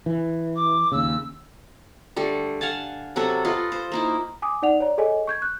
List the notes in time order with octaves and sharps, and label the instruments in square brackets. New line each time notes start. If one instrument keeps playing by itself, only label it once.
[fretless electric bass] E3
[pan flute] D6
[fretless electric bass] D#2 C#3 [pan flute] E6
[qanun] D3 G3 A3
F5 F#5 G#5 A5
C3 F#3 F#4 A4
F4 A4 B4 D#5
C5
A#3 D#4 E4
[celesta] G#5 D6 D#6
D#4 D5 F#5 F7
C#5 D5 A#5
G#4 A4 C#5 D#5 G#5
C#6 G6 G#6
F#6 G6